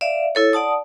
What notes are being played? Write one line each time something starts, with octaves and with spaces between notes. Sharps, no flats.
D5 E5 F5
E4 A4 C#5
D5 F#5 A5 D#6